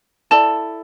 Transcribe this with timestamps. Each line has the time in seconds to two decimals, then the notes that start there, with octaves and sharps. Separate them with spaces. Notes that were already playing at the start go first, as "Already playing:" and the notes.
0.31 E4 A4 D5 A5